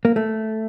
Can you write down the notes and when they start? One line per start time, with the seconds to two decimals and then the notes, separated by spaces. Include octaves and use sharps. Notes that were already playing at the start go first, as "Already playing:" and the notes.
0.05 A#3
0.16 A3